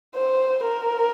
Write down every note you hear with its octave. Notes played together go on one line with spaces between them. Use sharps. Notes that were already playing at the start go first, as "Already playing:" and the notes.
C5
A#4